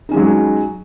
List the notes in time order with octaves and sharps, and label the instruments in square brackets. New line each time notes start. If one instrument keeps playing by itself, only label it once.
[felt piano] D#4
C#4
G#3
F#3